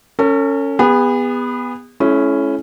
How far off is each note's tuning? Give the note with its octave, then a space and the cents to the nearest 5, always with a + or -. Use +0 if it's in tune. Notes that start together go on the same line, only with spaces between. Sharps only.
C#4 +0 A4 +45
B3 +0 G#4 -40
A3 -40 C#4 +0 E4 +10